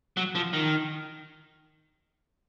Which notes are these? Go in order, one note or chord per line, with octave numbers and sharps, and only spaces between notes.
F#3
F3
D#3